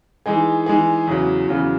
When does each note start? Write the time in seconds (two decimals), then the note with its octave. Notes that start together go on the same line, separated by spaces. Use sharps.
0.26 E3 G#3 D#4 G#4
0.66 E3 G#3 D#4 G#4
1.07 E2 C#3 F#3
1.48 E2 C#3 F#3